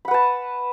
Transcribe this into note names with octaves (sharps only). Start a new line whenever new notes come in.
B4 F#5 A5 B5